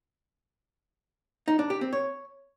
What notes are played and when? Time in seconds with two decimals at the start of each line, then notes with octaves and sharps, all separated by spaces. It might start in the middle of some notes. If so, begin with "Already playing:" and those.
1.48 D#4
1.59 D4
1.70 G4
1.81 C4
1.93 C#5